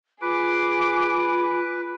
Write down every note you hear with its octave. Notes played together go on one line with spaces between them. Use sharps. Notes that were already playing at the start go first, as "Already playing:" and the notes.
F4 G#4 B4 D6